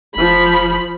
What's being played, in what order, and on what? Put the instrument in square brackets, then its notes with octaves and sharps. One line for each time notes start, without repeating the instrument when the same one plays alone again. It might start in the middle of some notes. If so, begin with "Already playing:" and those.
[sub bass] F1 [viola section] F3 B5